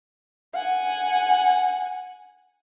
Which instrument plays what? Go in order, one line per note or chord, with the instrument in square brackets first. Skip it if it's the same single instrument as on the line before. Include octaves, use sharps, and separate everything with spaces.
[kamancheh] F#5 G#5